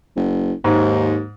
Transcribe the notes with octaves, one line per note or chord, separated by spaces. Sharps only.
F#1
D#2 G#2